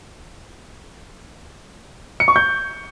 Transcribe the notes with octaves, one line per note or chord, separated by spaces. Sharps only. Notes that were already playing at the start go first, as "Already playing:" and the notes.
C#7
C#6
G6